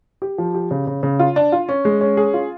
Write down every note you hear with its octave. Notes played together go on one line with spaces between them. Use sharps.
G4
F3
G4
C#3
C#3
C#3
F4
D4
F4
C#4
G#3
C#4
G#4
F4